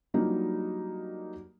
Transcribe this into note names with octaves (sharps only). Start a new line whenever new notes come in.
F#3 G3 A#3 D4 D#4 F4